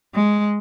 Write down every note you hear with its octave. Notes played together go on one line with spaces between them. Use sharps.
G#3